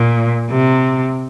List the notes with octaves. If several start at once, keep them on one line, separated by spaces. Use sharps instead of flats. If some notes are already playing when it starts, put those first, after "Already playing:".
Already playing: A#2
C3